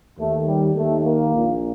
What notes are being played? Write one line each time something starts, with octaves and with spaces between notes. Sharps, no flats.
D#2 D#3 A3
G3
D#2 D#3 A3
A#3
A#1 A#2